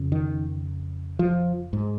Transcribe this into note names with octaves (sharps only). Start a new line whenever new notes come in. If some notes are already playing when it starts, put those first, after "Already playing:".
Already playing: F2 C#3
D#3
F3
G#2